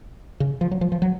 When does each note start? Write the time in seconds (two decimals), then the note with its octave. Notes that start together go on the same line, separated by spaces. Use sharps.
0.40 C#3
0.61 F3
0.71 F#3
0.81 F3
0.92 F3
1.02 F#3